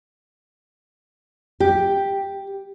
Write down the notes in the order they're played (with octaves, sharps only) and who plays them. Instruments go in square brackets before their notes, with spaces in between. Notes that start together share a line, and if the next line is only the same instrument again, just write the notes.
[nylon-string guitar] G4